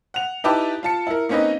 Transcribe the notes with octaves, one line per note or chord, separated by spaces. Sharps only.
F#5 F7
D#4 E4 G4 B4 A5 D6
F4 A5 C#7
E4 A#4
A#3 C4 C#4 D#4 B4 D#5